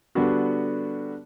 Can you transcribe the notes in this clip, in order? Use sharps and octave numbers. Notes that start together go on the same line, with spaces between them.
D3 G3 B3 D4 F#4